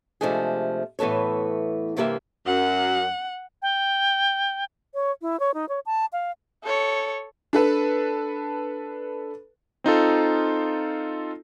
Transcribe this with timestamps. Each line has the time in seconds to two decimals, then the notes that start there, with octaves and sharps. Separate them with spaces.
0.21 C3 F3 G#3 A3 D4 G#4
0.99 A2 E3 B3 A4 C#5
1.97 G2 C3 E3 A#3 G4 E5
2.46 F#2 F#5
3.62 G5
4.94 C#5
5.22 E4
5.40 C#5
5.54 D#4
5.69 C#5
5.86 A5
6.13 F5
6.64 A4 C#5
7.53 D4 A4 B4
9.84 C4 D#4 F4 A4